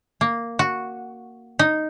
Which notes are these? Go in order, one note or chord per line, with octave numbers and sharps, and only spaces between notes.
A#3
F#4
D#4